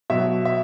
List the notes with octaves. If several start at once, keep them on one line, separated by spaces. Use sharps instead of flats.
B2 F#3 E5
E5